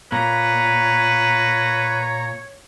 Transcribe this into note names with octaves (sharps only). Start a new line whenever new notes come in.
A#2 B4 C#5 A#5